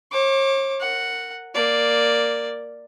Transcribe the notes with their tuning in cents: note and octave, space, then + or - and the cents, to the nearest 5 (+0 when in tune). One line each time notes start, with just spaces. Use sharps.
C#5 -40 D6 +0
A#4 -20 F#5 +0
A#3 +0 D5 +0